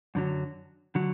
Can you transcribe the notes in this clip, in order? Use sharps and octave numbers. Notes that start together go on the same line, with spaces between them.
F#2 D3 F#3
D3 F#3